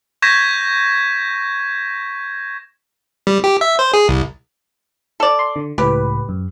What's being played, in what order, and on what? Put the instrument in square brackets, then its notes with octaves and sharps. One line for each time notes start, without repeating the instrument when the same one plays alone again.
[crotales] C#6 G6 G#6 A#6 B6 E7
[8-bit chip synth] G3
G4
E5
C5
G#4
C2
[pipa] A4 D5
[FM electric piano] C6
D3
[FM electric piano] C#2 A2 B4 [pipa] G4
[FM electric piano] F#2